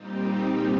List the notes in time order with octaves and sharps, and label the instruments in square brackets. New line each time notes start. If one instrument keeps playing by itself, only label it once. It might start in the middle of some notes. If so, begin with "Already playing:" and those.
Already playing: [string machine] A#2 G3 C4 D#4 G4